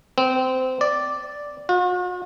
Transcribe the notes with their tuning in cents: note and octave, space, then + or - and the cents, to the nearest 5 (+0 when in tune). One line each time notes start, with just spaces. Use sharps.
C4 -20
D5 -5
F#4 -45